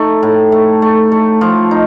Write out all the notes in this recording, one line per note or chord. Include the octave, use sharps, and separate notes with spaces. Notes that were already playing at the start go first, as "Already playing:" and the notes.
Already playing: A3 D#4
A2
A3
A3
A3
F3
D#4